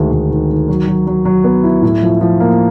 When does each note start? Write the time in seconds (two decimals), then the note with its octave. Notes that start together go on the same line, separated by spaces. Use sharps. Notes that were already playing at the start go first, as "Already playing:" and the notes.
Already playing: D2 D#3 G#3
0.11 D2
0.31 D#3
0.50 D#3
0.68 F#3
0.87 F#3
1.07 F#3
1.25 F#3
1.44 B3
1.64 E4
1.82 A2
2.02 F3
2.21 F3
2.40 A#3